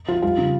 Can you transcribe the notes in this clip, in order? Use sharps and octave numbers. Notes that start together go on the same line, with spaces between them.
F3 F4
G3 F4
C#3